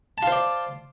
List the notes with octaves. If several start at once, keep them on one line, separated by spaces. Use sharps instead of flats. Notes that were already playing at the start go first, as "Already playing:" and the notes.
F4 C5 D5 A5